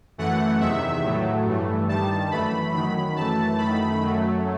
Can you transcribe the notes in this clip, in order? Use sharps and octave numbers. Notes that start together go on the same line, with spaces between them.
F#2 E3 A3 F#5
E2 C3 D#3 E5
A2 F#3 A3
G2 E3 A3
G2 D#3 G3 A5
F#2 E3 A3 B5
F#2 D#3 F#3 B5
F#2 E3 A3 A5
F#2 D#3 A3 B5
F#2 F#3 A3